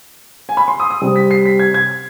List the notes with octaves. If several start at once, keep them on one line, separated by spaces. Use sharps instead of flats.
G#5
B5
C6
D#6
D#6
C3 G3 C4
B6
C7
B6
G#6
G#6